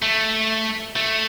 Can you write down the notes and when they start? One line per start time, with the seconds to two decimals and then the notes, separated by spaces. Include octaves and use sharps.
0.02 A3
0.96 A3